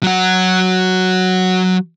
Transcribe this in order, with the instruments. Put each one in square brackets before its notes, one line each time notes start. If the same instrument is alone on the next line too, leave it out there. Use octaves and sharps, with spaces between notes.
[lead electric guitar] F#3 F#4